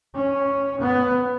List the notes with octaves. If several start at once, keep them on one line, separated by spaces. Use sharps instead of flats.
C#4
B3